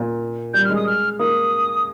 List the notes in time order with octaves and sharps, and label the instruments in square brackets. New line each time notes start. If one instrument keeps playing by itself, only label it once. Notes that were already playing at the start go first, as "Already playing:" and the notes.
Already playing: [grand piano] A#2
[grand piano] G3 [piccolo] G6
[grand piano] G#3 [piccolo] F6
[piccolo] D#6
F6
[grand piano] A#3 [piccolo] D#6